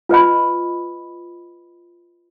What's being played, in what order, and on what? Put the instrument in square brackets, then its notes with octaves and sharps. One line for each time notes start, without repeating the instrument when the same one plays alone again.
[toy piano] F4 B4 D#5 B5